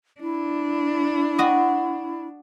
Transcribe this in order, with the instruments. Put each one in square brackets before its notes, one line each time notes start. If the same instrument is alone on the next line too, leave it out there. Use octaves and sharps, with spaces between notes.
[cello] D4 [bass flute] E4
[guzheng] F#4 D#5